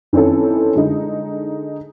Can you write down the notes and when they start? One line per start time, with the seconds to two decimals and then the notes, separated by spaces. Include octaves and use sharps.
0.13 D#3 E3 C4 C#4 A4
0.76 D3 G#3 D#4